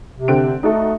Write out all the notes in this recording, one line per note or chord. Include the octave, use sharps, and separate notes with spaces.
C3
D3 C4 D7
A3 D#4 F#4 A4